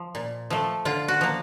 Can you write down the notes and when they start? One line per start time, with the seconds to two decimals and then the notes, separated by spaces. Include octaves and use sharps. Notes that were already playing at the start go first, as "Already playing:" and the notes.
Already playing: F3
0.15 A#2
0.50 F3 A3
0.85 D3 F4
1.08 F#4
1.21 F3 A#3